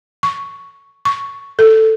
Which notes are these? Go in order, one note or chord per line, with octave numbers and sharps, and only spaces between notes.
C#6
C#6
A4